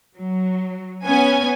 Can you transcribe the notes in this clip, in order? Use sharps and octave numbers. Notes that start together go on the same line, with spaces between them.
F#3
B3 C#4 G#5